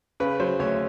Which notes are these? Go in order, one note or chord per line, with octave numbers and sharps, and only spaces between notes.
C#3 B4
F#3 C5
D2 C#5